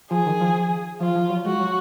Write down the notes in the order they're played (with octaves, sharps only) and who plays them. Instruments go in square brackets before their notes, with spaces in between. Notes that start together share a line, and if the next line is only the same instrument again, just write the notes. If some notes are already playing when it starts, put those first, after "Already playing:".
[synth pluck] F3 [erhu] G#4
[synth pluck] D#3
F3
[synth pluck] F3 [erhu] F4
[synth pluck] F3
F#3
[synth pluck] G#3 [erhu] F#4
[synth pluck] F#3